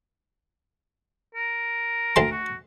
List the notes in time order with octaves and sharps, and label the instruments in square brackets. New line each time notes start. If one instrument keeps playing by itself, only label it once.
[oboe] A#4
[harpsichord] D2 A5 C6
[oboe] F#4